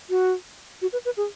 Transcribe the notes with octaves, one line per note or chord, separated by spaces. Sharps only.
F#4
F#4
B4
B4
G#4